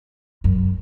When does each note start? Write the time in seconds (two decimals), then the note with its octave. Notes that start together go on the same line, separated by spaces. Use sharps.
0.44 F#2